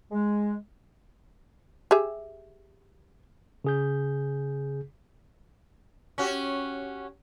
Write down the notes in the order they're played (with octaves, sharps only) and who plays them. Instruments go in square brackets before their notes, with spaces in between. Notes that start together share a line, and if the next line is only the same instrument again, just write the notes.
[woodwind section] G#3
[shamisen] G4 G#4 E5
[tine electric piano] C#3 G#4 G6
[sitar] C#4 F#4 G4